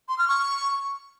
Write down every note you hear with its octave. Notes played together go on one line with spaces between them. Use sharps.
C6
F6
C#6